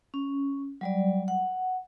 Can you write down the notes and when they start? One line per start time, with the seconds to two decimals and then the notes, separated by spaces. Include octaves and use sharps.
0.14 C#4
0.81 F#3 G3 D5
1.28 F#5